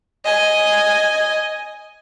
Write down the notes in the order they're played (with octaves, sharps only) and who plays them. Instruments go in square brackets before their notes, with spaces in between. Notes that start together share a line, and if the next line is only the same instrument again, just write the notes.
[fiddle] D#5 G#5